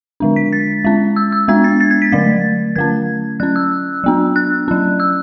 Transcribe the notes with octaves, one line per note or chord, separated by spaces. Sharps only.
D3 G#3 D4
B6
A6
G#3 C#4
E6
E6
G#3 B3 D4 G#6
A6
A6
G#6
B6
D3 F#3 A3 A6
D3 A3 C#4 G#6
F#3 C#4 F#6
E6
F#3 B3 D4
F#6
F#3 C#4
E6